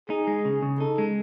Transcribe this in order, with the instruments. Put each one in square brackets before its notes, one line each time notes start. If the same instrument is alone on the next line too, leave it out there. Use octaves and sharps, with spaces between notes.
[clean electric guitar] D#4 [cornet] G#4
[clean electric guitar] G#3
C#3
C#3
[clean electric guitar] D#4 [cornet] A4
[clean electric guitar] G#3